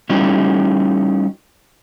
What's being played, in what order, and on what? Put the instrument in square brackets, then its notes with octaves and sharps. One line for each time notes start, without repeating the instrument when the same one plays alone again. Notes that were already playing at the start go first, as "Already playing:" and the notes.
[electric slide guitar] G3 A3 C#4 D#4 E4 F#4